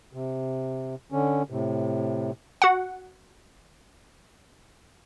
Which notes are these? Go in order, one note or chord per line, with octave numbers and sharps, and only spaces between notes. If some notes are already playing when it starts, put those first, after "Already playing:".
C3
D3 C#4
A2 C3
F#4 F#5